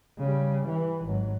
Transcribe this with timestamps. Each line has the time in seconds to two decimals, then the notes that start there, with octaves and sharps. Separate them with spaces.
0.18 C#3 G3
0.67 E3
1.05 G#1 F#3